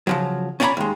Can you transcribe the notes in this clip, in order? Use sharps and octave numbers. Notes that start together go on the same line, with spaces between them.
C#3 F3 F#3
C#4 C#5 D5 E5 A#5 B5
D#2 G#3